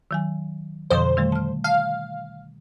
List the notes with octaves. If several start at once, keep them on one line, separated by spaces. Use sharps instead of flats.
D#3 F#3 G#5
F2 B2 D3 C5
D#3 G3 A3
A5 F6
F5 A5